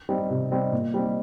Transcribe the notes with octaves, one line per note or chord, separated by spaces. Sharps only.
G3 C4 D#4
C3
G3 C4 D#4
A#2
G3 C4 D#4